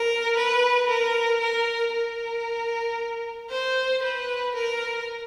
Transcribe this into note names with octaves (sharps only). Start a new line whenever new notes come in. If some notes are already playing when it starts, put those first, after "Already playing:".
Already playing: A#4
B4
A#4
A#4
A#4
C5
B4
A#4